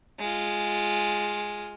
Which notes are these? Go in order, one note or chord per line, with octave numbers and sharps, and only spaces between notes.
G#3 F4